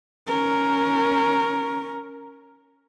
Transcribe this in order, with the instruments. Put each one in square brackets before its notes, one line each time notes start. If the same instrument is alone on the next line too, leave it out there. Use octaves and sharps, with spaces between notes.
[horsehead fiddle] C#4 A#4